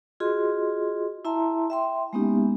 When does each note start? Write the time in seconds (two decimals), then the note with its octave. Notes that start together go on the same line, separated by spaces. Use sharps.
0.20 F4 F#4 G#4 D#5 C6
1.25 E4 E5 A5 A#5 C6
1.70 E5 G5 C6
2.13 G#3 A#3 B3 C#4 D#4 G4